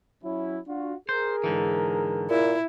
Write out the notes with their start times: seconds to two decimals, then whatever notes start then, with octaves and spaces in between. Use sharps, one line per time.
0.24 F#3 C#4 E4
0.68 D4 F4 F#4
1.09 G#4 A#4 C5
1.44 G#2 D3 E3
2.30 A#2 E4